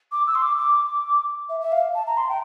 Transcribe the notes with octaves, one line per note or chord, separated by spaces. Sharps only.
D6
E6
C6
D6
D6
E5
E5
F5
A5
A#5
C6
G5